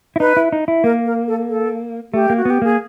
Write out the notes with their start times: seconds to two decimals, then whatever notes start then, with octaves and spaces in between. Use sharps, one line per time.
0.16 E4
0.20 D#4 B4
0.37 E4
0.52 D#4
0.68 E4
0.84 A#3 A#4
1.06 A#4
1.28 A4
1.49 A4
2.14 A3 G4
2.30 A#3
2.37 F#4
2.45 B3 G4
2.62 A#3 G#4